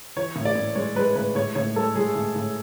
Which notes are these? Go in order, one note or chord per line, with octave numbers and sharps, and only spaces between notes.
E3 C#5
A2
D5
A2
G#3 C#5
G#3 B4
A2 B4
A2 C#5
A2 C#5
G#3 A4
G#3 G#4
A2
A2